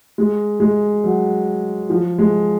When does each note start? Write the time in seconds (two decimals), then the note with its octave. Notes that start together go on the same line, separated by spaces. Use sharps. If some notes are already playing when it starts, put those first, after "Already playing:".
0.18 G#3
0.60 G#3
1.04 F#3
1.90 F3
2.18 G#3